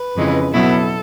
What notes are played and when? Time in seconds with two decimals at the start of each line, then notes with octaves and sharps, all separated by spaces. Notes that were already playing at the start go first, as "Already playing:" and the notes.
Already playing: B4
0.16 F2 C#3 E3 G#3
0.53 B2 F#3 B3 E4 A4